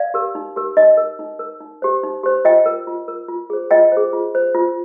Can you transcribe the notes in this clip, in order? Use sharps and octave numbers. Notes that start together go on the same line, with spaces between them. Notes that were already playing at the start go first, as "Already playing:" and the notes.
Already playing: D5 F5
G4 A#4
D#4
G4 A#4
D#4 D#5
A#4
D#4
A#4
D#4
G4 C5
D#4
G4 C5
F4 D#5 G5
A#4
F4
A#4
F4
G#4 C5
F4 D#5 G5
G#4 C5
F4
C5
F4